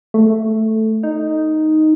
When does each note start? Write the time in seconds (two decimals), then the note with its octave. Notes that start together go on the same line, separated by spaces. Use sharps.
0.14 A3
1.03 D#4